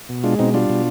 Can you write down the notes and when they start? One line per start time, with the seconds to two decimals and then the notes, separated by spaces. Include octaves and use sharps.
0.09 B2
0.24 G#3 D4 F4
0.39 B2 C4 D#4
0.54 G3 D4 F4
0.70 B2